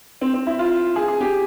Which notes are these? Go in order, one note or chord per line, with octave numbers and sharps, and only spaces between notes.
C4
C4
E4
F4
G#4
G#4
G4